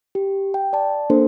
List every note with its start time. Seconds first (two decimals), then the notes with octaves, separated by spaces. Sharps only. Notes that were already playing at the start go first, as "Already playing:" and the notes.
0.15 G4
0.54 G5
0.73 D5 A5
1.10 A#3 D4 A4 C5